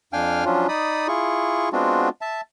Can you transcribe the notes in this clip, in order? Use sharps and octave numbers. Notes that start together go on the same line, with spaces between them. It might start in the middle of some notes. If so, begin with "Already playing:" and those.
F2 D4 F5 G5 G#5 F6
F3 F#3 C#4 D4 F4
D#4 D5 B5 D#6
E4 F4 G#4 C#6
G#3 B3 C4 D4 F4 F#4
E5 A5